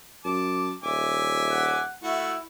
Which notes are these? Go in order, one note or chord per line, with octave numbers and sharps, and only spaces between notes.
F#2 A5 D6
D#1 E5 G#5 D6
F#5
A3 E4 F#4